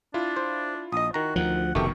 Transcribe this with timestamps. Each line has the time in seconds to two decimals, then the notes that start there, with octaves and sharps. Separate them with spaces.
0.14 D4 E4 F4
0.37 C5
0.92 A#1 D#5 D#6
1.14 D#3 F#4 A#5
1.36 D2 F3 F#5
1.75 F1 B2 D#3 A3 G4 C#6